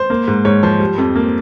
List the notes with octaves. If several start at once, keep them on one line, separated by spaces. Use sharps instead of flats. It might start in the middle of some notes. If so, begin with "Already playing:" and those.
Already playing: C5
A#3
G#2
G#2 C#5
F3 C5
G3
F2
A#3